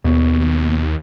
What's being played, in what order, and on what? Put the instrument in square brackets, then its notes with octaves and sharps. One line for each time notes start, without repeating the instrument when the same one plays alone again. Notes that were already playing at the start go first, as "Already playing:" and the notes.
[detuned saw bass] D#2 [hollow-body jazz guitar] B2